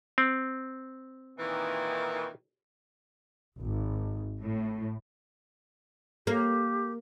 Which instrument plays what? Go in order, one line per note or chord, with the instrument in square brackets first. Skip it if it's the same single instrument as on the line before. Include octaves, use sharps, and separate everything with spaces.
[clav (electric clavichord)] C4
[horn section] A#2 D#3 E3
[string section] G#1
A2
[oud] A#3 [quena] G4